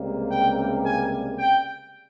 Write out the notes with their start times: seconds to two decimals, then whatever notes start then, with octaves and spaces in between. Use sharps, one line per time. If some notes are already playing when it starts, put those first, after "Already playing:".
Already playing: C#2 C3 G3 A#3
0.30 G5
0.84 G#5
1.38 G5